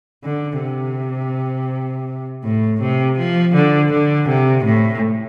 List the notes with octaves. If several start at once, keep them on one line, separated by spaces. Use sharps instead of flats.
D3
C3
A2
C3
F3
D3
D3
C3
A2